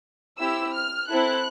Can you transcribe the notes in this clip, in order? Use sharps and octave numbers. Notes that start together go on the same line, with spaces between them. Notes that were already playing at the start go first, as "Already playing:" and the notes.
C4 E4 G4 E6
F6
C4 E4 A4 F#6